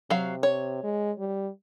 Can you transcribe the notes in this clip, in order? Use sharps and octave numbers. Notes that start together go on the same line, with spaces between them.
C3 F#3 F5
C#5
G#3
G3